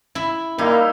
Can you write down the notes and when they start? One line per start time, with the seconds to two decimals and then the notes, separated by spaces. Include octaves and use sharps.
0.15 E4
0.58 G3 A#3 D#4 E4